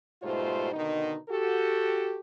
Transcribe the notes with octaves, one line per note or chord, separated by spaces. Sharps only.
G#2 B2 G3 A3 F4 C5
B2 D3 D#3 D#4
F#4 G4 A4